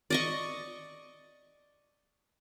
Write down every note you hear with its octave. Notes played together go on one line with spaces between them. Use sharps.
D5 D#5 C#6